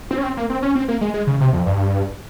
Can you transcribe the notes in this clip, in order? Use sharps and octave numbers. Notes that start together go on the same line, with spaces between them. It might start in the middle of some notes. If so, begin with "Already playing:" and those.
C4
C#4
C4
A#3
C4
C#4
C4
A#3
G#3
G#3
C#3
C3
F2
G2